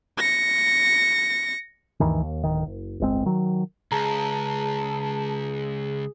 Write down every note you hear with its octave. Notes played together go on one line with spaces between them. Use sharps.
A#6 C#7
D2 G2 D#3 E3
D#2
D1 D#3
F#1
D1 G1 G#3 C4
D#3 F#3
C#2 G#4 A5 A#5